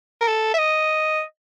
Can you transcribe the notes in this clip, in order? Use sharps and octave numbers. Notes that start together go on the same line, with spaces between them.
A#4
A4
E5
D#5